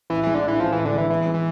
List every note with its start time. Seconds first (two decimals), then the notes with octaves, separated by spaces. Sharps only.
0.10 A1 E3
0.23 E3 G#3
0.35 D3
0.43 A2 E3
0.60 A1 F3
0.72 A1 E3
0.85 D3
0.93 E3 G#3
1.10 E3 B3
1.25 G#3
1.34 E3